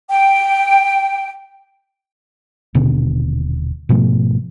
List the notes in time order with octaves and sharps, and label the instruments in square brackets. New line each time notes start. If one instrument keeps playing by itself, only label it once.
[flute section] G5
[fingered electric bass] D#1 B2 D3
G#2 B2 F3 A3